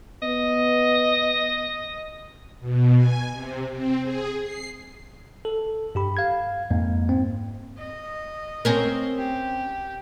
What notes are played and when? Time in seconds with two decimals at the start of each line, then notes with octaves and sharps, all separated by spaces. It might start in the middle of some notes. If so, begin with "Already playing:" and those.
0.22 B3 D#5
2.60 B2
2.97 G#5
3.32 C3
3.71 C4
4.03 G#4
4.42 C7
5.45 A4
5.95 G2 G4 B5
6.17 F5 G#6
6.71 F2 G#2 A#3
7.09 C4
7.78 D#5
8.65 C4 C#4 A#4
9.18 G4